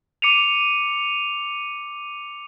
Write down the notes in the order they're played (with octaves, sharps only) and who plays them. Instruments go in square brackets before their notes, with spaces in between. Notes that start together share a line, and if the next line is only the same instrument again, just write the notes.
[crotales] D6 C#7 D#7 F7